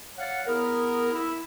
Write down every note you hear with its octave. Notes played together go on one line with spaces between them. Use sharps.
C#5 D5 F5 F#5
B3 E4 G#4 A#4
E4